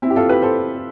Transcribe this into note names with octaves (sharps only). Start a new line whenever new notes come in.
C4 E4
G4
F4 A4
G4 B4
A4 C5